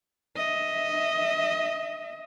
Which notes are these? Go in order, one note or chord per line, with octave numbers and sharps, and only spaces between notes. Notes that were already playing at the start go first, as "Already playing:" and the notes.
D#5 E5